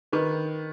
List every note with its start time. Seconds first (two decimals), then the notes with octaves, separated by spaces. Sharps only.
0.12 D#3 B4